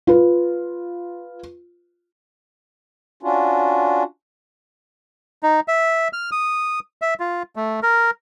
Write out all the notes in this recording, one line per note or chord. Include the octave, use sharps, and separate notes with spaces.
F4 B4
C#4 D4 F4 F#4
D#4
E5
F6
D#6
E5
F4
A3
A#4